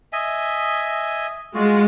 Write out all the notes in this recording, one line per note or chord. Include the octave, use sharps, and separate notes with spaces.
D#5 E5 G#5
G#3 F4 F#4